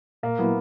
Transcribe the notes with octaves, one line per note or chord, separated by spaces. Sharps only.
A#2 A#3
F#3 A#3 B3 E4